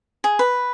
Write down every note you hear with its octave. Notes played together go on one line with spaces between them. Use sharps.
G#4
B4